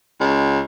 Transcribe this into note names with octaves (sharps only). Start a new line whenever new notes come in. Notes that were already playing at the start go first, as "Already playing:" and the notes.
C#2